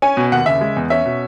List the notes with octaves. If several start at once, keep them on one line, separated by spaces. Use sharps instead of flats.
C#4 G#5
B2
D#2 F#5
C#3 E5
G#3
E2
C#4 E5
B2